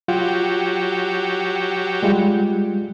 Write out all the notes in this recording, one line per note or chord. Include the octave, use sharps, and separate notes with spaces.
F#3 F4 G4
G3 G#3 F4